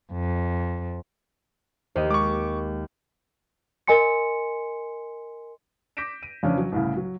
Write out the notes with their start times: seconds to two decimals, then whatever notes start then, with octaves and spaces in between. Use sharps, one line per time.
0.13 F2
1.96 D#2 C5 D#5
2.11 G#3 C#6 D6
3.88 A#4 D#5 G#5 C6 C#7
5.97 D6 G6 A#6 B6 D7 E7
6.23 D#7
6.43 F2 C#3 E3 C#4 D4
6.57 F#3
6.72 C2 A2 C#3
6.96 F#3